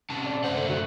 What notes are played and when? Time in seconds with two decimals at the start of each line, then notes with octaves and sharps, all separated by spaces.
0.10 C3 C#4 A5
0.26 D5
0.44 F#2 A3 C5 F#5
0.56 D3
0.69 F#4